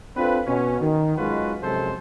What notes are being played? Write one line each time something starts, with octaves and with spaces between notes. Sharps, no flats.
C4 D4 F4 A4 B4
B2 C#4
D#3
F#2 G#3 D#4 F4 F#4 B4
F#2 C3 F3 G#3 A4 C5